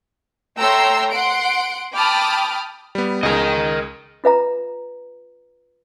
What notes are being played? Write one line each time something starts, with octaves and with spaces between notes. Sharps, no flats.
A3 C#5 G5 A#5 C6 E6
F#5 C6 D7
G5 A5 B5 D6 D#6 F6
G3 B3
C#2 G#4 A#4 D#5
F4 B4 E5 A#5